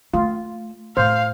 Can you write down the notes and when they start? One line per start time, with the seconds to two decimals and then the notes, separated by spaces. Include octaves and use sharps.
0.13 A3 F4
0.97 A2 C5 F5